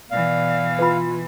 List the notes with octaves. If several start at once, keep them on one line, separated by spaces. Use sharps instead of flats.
B2 E3 D5 F5
F4 B4 B5